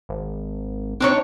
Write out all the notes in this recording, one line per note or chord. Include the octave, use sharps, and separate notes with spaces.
G#1
C4 D4 D#4 C#5